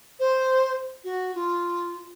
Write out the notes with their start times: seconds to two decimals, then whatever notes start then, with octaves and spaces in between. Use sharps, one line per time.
0.20 C5
1.04 F#4
1.35 F4